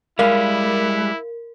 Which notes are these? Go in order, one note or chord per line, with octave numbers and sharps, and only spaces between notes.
G3 G#3 E4 A#4 F5